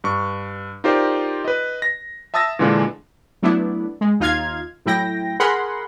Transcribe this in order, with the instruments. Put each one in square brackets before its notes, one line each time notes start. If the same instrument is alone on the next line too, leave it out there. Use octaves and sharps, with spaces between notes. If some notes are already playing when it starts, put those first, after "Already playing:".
[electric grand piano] G2 C#6
D#4 F4 G4 A#4 C5 D5
B4 D#5
A#6
E5 A5 D#6 E6 A6 A#6
A#2 D3 E3 G#3 D4 F4
[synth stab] F#3 A3 B3 D4 E4
G#3
D#2 D#4 F4 F5 F6 G#6
A2 F#3 E4 G5 A#6
G#4 A#4 F#5 B5 C6